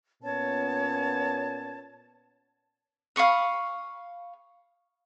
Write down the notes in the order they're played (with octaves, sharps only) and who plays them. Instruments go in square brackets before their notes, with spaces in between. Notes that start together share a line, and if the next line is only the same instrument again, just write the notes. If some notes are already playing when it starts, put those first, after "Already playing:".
[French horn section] A#2 B3 C#4 [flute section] C#5 A5
[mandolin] F5 B5 C#6 D#6